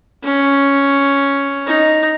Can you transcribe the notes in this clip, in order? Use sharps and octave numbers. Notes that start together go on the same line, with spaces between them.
C#4
D#4